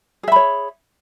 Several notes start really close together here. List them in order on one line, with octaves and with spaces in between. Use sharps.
G#4 E5 B5 C#5